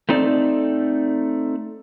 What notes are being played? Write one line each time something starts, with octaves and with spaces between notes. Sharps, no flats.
A3 C4 D#4 A4 D5